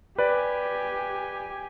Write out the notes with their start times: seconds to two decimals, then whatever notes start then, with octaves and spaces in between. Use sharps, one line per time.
0.18 G4 B4 D5 G#5